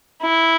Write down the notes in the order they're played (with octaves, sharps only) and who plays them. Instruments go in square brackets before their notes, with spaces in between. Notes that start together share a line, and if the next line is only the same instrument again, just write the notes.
[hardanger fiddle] E4